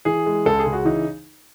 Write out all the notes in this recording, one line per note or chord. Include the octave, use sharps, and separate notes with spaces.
E3 G#4
G#3
C#2 A4
G#4
C#3
F#4
E3 D#4